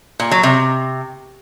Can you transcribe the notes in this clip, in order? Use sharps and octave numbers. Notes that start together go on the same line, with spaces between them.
A#2
F#3
C3